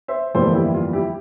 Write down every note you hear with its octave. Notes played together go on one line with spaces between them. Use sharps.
C5 E5
G1 F2 E3 G3 A#3 A4 C5
E4 G4
F4
E4 G4